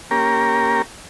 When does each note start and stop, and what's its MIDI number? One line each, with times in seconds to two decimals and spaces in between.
0.11 0.82 58
0.11 0.82 61
0.11 0.82 67
0.11 0.82 70